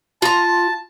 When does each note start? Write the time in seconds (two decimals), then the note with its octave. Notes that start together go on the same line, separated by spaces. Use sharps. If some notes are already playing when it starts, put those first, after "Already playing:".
0.22 F4 A5 A#5